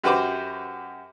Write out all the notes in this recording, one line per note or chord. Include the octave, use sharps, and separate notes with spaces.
F#2 F#4 G4 B4 C5 D6